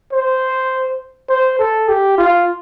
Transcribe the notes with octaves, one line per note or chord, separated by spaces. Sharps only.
C5
C5
A4
G4
F4